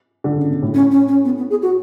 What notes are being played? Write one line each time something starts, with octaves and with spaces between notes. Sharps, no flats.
D3
C#3
B2
A2
C#4
C#4
C#4
B3
B3
G#4
F#4